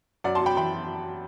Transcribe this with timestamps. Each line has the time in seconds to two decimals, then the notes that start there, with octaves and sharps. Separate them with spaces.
0.24 F#2 D5 F#5
0.35 A5 C6
0.41 F#2 G5 B5
0.57 E3 G5 B5